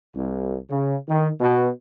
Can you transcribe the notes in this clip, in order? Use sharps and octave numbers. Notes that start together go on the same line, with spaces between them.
C2
C#3
D#3
B2